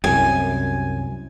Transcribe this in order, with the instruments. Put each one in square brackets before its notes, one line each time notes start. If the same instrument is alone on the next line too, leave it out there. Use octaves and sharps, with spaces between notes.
[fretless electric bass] C2 F#2 [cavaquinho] G#5